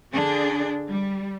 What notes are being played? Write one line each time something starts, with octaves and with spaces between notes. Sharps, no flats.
D3 D4 G#4
G3